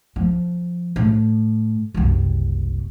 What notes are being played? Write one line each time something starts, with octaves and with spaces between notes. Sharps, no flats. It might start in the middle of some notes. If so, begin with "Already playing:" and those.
F3
A2
F#1 C2